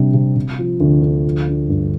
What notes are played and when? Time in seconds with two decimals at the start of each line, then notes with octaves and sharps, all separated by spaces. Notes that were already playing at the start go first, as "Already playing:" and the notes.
Already playing: C3 G3 D4
0.14 C3
0.36 C3
0.59 F3
0.80 D2
1.02 D2
1.24 F3
1.47 D4
1.69 G2